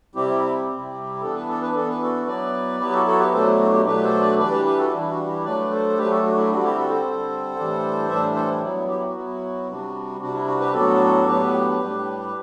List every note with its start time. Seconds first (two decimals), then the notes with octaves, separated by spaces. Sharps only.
0.15 C3 G3 C4 E4 G4
0.68 C3 G3 C4 E4
1.21 E3 B3 D4 A4
1.34 B4
1.48 A4
1.62 B4
1.74 E3 B3 D4 A4
1.88 B4
2.02 F#4 A4
2.27 F#3 B3 E4 B4 D5
2.80 F#3 B3 E4 G4 B4
2.93 F#4 A4
3.06 F#4 A4
3.19 G4 B4
3.33 B2 F#3 A3 D4 A4 C5
3.46 E4
3.59 F#4
3.72 E4 G4
3.86 B2 F#3 A3 D4 G4 B4
4.03 A4 C5
4.21 B4 D5
4.38 E3 G3 D4 B4 D5
4.52 G4 B4
4.65 G4 B4
4.78 F#4 A4
4.91 E3 G3 D4 E4
5.09 F#4
5.27 E4 G4
5.44 F#3 A3 D4 B4 D5
5.70 A4 C5
5.97 F#3 A3 D4 G4 B4
6.10 F#4 A4
6.24 F#4
6.36 E4
6.50 D3 G3 C4 F#4
6.63 E4 G4
6.76 F#4 A4
6.90 A4 C5
7.03 D3 G3 C4
7.56 A2 E3 G3 D4
8.08 A2 E3 G3 D4 C5 E5
8.35 A4 C5
8.48 E4
8.61 F#3 B3 E4
8.88 E4 G4
9.01 F#4
9.14 F#3 B3 E4
9.67 C3 G3 D4
10.20 C3 G3 D4 F#4
10.34 E4
10.47 F#4
10.60 G4 B4
10.73 A2 F#3 B3 D4 F#4 A4
11.26 A2 F#3 B3 D4 G4 B4
11.79 A2 G3 D4